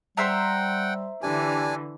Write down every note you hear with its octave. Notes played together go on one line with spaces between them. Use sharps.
G3 C5 E5 F#5 G5 A#5
D3 E3 D4 G4 G#5